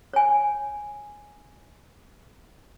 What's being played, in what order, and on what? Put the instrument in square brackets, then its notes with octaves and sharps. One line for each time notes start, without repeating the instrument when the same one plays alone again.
[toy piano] C#5 G#5